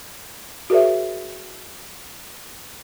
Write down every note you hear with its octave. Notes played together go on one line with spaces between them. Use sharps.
F#4 G#4 A#4 C5 D5 E5